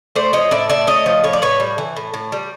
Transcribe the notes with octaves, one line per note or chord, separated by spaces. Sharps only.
A3 C5 D5
F3 C#5 D#5
A2 D5 E5
A2 D5 E5
A3 C#5 D#5
F3
A2 C#5
D5
A2 B4 C#5
G3
E3
A2
A2
G3